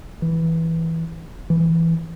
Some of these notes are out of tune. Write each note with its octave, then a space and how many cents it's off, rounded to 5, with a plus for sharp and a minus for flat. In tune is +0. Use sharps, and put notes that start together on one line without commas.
E3 -10
E3 +5